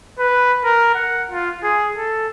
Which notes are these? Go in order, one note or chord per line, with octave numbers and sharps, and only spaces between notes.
B4
A#4
F#5
F4
G#4
A4